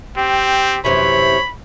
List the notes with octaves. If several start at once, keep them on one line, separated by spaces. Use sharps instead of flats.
C4 G4
F#2 C3 E3 C#5 B5